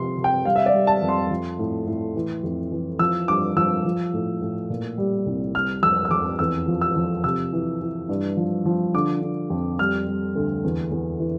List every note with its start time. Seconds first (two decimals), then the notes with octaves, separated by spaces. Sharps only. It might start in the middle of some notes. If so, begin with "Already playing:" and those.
Already playing: C3 F3 C6
0.17 C3
0.24 G5
0.45 G3 F5
0.56 E5
0.66 D5
0.74 G3
0.87 A5
1.02 F2
1.09 C6
1.30 F3
1.59 A2
1.87 A2
2.15 E3
2.43 F2
2.72 E3
2.99 F3 E6
3.28 G2 D6
3.57 F3 E6
3.85 F3
4.13 A2
4.42 A2
4.70 A#2
4.98 G3
5.26 C2
5.54 G3 F6
5.83 F2 E6
6.05 E6
6.11 F2 D6
6.39 E2 E6
6.68 F3
6.81 E6
6.96 F3
7.24 C3 E6
7.53 E3
7.81 E3
8.09 G2
8.37 F3
8.65 F3
8.94 D3 D6
9.22 D3
9.50 F2
9.79 G3 F6
10.07 G3
10.35 D2
10.64 E2
10.91 E2
11.20 E3